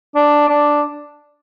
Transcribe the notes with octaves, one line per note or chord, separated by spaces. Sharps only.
D4
D4